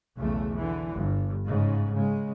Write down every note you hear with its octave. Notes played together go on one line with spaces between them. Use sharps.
B1 E2 C#3 A3
D3 E3
G1 G2
G#2 C#3
C#3 G#3